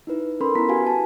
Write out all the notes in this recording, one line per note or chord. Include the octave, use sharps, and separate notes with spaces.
D#4 E4 B4
C#4 A4 A#4 B5 C6
B3 E4 A#5 B6
F#4 G4 B4 F5 G#5
A5